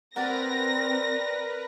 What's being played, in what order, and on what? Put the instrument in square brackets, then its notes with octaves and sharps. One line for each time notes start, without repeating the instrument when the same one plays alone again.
[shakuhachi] C4 [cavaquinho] G4 D5 F#5 [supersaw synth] A#4 B4 [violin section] A#6